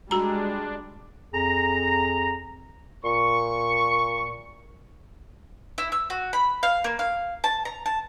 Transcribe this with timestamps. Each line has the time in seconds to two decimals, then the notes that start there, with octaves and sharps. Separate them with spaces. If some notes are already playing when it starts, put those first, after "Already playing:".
0.11 G3 G#3 D4 F#4 A#5
1.34 F2 G#4 A#5
3.05 A#2 C#6
5.78 E4
5.92 E6
6.10 F#4
6.33 B5
6.63 F5
6.84 A#3
6.99 F5
7.44 A5
7.65 A#5
7.86 A5